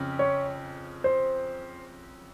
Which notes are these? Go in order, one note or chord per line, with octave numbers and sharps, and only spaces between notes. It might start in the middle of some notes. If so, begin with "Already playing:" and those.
Already playing: F2 C#3
C#5
C5